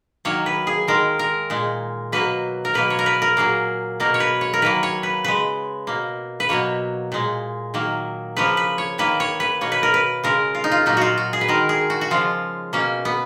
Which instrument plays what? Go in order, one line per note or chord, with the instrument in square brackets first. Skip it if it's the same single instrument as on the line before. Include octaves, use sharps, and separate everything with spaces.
[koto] D#3 F#3 A#3 C#5
B4
G#4
D#3 G#3 A#4
A#4
A#2 G#3
B2 F#3 A#3 B4
A#4
B2 F#3 A#3 B4
C#5
A#4
B4
A#4
A#2 F#3 A#3 G#4
B2 A#3 A#4
C#5
B4
C#5
A#4
D#3 F#3 A#3 B4
C#5
B4
C#3 G#3 B4
B2 A#3
B4
B2 F#3 A#3 C#5
A#2 G#3
D#3 F#3 A#3
C#3 F3 A#3 B4
B4
C#5
D#3 A#3 B4
C#5
B4
B2 A#3 C#5
B4
A#4
B4
C#3 G#3 A#4
F4
D#4
F4
A#2 F#3 A#3 D#4
F4 F#4
F#4
G#4
B4
D#3 G#3 A#4
G#4
F#4
F#4
C#3 F3 G#3 F4
B2 A#3 C#4
B3